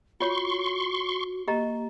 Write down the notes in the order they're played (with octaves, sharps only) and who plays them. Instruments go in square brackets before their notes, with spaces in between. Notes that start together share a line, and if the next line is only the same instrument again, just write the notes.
[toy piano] F4 C#5 [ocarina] F#4 [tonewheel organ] C6 C#6
[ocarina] A#3 [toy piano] G4 D#5 A#5